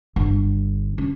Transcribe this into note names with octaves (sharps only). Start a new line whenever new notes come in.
G1
C#4